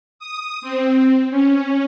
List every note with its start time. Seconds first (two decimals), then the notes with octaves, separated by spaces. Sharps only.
0.19 D#6
0.62 C4
1.31 C#4